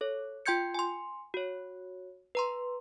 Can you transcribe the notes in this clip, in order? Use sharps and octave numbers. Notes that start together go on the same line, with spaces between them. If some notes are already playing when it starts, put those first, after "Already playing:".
A4 C#5
F4 G5 C6 G6 G#6 C#7
G#5 C6
F#4 C#5
B4 A#5 C6